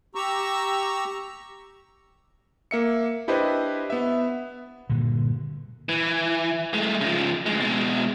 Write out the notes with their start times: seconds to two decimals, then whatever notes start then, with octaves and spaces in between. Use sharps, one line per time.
0.15 G4 A#5 C#6 E6
2.71 A#3 E5 C#7
3.28 D4 E4 G4 B4 C5 D#5
3.90 B3 E5
4.90 G2 A#2 D3
5.89 E3
6.74 G#3 A3
7.01 C#3 F3
7.46 D2 G#3
7.62 B2 G#3